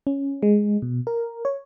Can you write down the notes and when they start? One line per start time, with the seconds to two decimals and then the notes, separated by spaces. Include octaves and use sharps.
0.07 C#4
0.43 G#3
0.82 B2
1.07 A#4
1.45 C#5